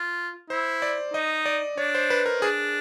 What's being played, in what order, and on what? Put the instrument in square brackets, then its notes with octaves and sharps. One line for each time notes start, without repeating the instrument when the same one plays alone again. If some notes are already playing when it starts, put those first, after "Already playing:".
Already playing: [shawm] F4
[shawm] E4 [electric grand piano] C5
[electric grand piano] D5
[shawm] D#4 [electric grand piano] D#5
[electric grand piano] D5
[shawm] D4 [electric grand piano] C#5
[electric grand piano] C5
B4
A#4
[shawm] D4 [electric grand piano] G#4